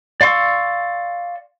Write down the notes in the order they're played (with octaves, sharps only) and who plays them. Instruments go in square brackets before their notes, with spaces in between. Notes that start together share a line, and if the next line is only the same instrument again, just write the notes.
[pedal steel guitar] D5 F5 C6 C#6 E6